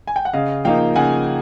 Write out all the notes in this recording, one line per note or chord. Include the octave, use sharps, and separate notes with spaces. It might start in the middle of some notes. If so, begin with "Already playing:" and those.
G#5
G5
F#5
C#3 D#5 F5
F3 A#3 D#4 F5 G5
C#3 F#5 G#5